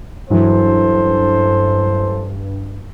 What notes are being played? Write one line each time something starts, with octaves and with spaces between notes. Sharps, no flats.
A1 G2 E3 F#3 A4 C5